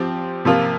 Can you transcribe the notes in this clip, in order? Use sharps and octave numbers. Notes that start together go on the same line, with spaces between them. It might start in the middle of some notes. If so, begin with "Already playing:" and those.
Already playing: F3 C4 G4
C3 F3 A#3 F4